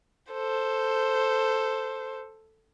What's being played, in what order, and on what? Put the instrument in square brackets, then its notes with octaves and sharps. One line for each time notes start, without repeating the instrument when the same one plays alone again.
[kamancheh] A4 C5